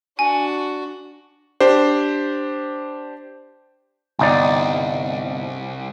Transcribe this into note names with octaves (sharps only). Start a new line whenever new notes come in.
D4 F#4 G#5
D4 G4 C5
G1 C2 D#4 D5